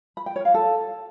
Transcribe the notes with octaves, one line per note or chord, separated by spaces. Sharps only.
B5
G5
C#5
F5
A4